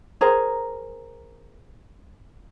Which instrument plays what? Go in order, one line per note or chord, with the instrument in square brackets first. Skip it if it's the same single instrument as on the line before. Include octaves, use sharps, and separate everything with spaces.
[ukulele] G#4 A#4 C5 A#5